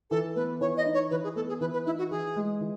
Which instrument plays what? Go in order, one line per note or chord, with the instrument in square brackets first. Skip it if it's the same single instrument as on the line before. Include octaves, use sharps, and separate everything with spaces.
[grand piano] E3 [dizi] A4
[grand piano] B3 [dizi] B4
[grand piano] E3 [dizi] C#5
[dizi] D#5
[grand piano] D#4
[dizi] C#5
[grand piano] E3 [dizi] B4
[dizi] G#4
[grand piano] B3 [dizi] A4
[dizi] G#4
[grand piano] E3 [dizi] B4
[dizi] B4
[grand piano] D#4 [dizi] E4
[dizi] F#4
[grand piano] E3 [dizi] G#4
[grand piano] G#3
E3